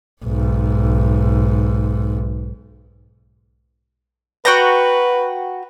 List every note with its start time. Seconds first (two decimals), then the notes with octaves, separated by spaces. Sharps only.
0.24 B1 G#2
4.45 F#4 B4 G5 A#5